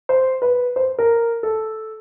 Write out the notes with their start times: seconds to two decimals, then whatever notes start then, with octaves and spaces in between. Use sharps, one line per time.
0.09 C5
0.42 B4
0.76 C5
0.99 A#4
1.43 A4